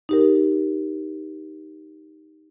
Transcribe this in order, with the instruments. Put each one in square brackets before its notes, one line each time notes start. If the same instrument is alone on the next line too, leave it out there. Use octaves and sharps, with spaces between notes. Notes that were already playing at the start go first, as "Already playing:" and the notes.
[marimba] D#4 G4 A#4